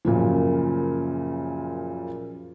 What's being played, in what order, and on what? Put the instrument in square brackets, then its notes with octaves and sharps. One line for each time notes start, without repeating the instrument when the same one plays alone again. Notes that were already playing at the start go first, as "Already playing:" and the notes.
[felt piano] F#2 A#2 C#3 F3